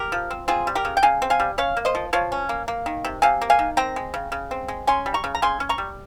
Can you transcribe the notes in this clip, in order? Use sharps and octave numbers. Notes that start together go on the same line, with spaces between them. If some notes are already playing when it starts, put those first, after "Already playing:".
Already playing: G4 A#4
F3
C4
C4 F4 G#4
G3
G4 A#4
C#3
G5
C#3 F5 G#5
C4
F5 G#5
G3
C#4 C#5 F5
A#3
C5 D#5
F3
F3 C#5 F5
C#4
A#3
A#3
D#3
C3
C3 F5 G#5
A#3
F5 G#5
D#3
C4 G5 A#5
G#3
C#3
C#3
C4
G#3
C#4 G#5 C6
G3
A#5 C#6
C#3
A#5
C#3 G#5 C6
C#4
A#5 C#6
G3